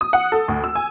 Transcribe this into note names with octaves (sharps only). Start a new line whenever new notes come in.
D#6
F#5
A4
D2
E6
G#5